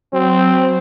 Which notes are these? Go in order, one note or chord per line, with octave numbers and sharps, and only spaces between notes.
F#3 C4